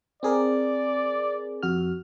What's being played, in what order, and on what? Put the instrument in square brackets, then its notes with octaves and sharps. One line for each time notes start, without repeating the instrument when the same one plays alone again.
[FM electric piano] C4 G#4 A#4 [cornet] D5
[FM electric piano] F2 F#4 F6